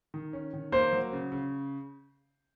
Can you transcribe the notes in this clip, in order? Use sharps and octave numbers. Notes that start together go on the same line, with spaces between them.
D#3
C#4
D#3
A#3 C5
F#3
C#3
C#3